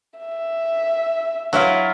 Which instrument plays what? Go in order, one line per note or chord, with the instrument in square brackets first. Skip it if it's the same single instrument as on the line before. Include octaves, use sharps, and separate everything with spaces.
[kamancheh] E5
[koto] F#3 E4 F4